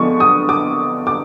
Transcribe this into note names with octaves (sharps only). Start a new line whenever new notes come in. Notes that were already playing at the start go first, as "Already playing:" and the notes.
Already playing: D3 F3 G#3 B3 C#6
D#6
D6
D6